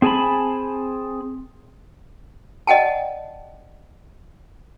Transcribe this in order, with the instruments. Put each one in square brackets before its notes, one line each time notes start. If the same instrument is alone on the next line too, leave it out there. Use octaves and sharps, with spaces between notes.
[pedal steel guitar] C4 G#4 G#5 A5 B5
[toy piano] D5 D#5 F#5 G5 A5